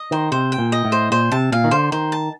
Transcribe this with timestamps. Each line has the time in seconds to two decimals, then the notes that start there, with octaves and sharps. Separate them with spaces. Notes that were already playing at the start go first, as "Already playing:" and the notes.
Already playing: D#5
0.11 D#3 C5
0.32 C3 C5
0.52 G5
0.58 A#2
0.72 D#5
0.85 A2
0.92 C5
1.12 A#2 C5
1.32 C3 A5
1.52 A#2 F5
1.64 D#3
1.71 D3 C5
1.92 D#3 C5
2.12 A5